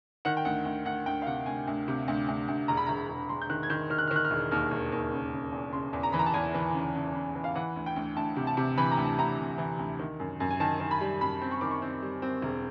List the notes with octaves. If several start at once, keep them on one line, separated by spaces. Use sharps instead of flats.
D#3 F#5
G5
D2 F#5
D2
D2 F#5
D2 G5
F5
C3 F#5
D2 G#5
D2
C3
D2
D2
D2
E1 A#5
B5
E1 A#5
E1
E1 C6
G6
D#3 F#6
G#6
D#3 G6
D#3 F6
F#6
D#3 F6
F#6
F6
E1
D#2 F6
E1
D#2
C#3
C#3
E2
C#3 C6
E2
A#5
E3 B5
A#5
A5
E2 G#5
E3
C#3
C#3
C#3
E3
F5
E3 F#5
D2
G5
D2
D2 A5
C3
A5
C3
E3 B5
A#5
D2
A5
D2 A#5
C3
E3
D2
D#3
F#2
F#2
G#5
D#3 A5
D#3
B5
G3
F#2 B5
C4
C#6
D#3 D6
C#6
C4
G3
C4
E1